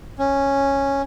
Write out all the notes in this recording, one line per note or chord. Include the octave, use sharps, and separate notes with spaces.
C#4